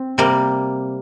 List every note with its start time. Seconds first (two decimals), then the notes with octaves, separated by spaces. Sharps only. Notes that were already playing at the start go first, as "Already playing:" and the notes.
Already playing: C4
0.18 C3 G3 A#3